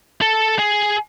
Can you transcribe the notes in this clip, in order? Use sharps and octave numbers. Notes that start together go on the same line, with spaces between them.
A4
G#4